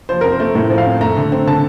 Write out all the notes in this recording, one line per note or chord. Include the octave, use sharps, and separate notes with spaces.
F3 C5
C4 A#4
C5
A3
A2 C5
F3
F5
C4
A3 A#5
D3
C4
D3 A5